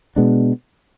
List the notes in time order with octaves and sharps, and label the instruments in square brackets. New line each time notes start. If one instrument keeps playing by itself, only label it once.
[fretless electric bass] B2 G#3 B3 D4